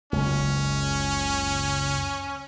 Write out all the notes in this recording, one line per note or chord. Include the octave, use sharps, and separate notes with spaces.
F#1 C#2 C#4